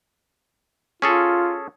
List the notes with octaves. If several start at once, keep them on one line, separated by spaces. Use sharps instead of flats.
C#4 F4 G#4 A4